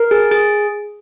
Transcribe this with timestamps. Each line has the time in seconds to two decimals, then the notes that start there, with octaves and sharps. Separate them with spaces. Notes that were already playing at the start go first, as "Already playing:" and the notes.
Already playing: A#4
0.11 G#4
0.31 G#4